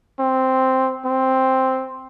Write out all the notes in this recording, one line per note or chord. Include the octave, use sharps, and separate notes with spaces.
C4
C4